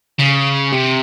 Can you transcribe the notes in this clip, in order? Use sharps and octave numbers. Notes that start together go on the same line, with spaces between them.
C#3
C3